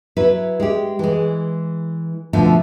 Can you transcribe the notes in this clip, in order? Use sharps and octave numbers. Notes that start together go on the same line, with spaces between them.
F#3 E4 B4
G#3 G4
E3 G#3
B2 D3 F3 A3